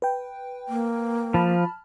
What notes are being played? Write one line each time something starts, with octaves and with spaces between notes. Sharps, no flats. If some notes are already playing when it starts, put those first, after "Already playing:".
B4 G5
A#3
F3 A5 B5 F6